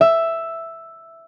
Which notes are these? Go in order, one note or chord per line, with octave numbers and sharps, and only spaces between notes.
E5